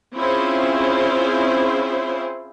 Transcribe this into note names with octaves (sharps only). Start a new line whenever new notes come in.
C4 C#4 E4 F4 G#4 C5